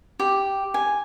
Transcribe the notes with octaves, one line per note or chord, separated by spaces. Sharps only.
G4
G#5